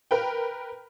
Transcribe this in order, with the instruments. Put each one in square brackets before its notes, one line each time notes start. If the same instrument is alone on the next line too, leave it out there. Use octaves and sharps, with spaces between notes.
[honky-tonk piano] A#4 B4 G5